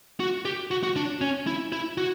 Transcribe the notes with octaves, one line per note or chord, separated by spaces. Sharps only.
F#4
G4
F#4
F#4
D4
C#4
E4
E4
F#4